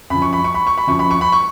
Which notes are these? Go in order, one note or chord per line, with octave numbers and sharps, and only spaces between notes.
F#2 F3 B5
C#6
B5
C#6
B5
C#6
B5
F#2 F3 C#6
B5
C#6
B5
C#6